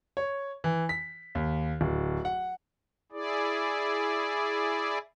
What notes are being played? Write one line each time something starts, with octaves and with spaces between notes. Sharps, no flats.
C#5
E3
B6
D#2
D1
F#5
E4 G#4 D5